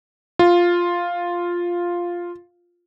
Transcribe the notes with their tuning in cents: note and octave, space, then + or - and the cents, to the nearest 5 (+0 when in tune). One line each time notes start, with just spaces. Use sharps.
F4 +0